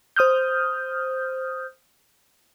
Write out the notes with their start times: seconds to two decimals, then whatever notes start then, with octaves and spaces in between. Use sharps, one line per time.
0.16 C5 D#6 F6 G6